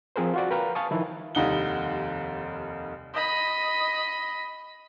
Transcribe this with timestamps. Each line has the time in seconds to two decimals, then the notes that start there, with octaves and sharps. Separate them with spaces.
0.16 F3 C4 G#4 A#4 C5
0.34 F4 F#4 D5
0.50 A#4 B4 F5 G5 A#5 F6
0.75 F5 G#5 A5 C#6 D#6
0.91 D#3 F3 E4
1.35 F1 D#2 G3 D#4 F#5 G7
3.13 D#5 B5